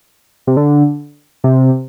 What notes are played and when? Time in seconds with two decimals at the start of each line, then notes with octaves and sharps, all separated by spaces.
0.47 C3
0.57 D3
1.44 C3